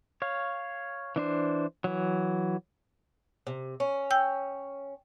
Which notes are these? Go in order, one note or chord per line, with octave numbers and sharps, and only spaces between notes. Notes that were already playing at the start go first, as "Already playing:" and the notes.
C#5 F5
E3 D4 C5
E3 F#3
C3
C#4
G5 E6 G6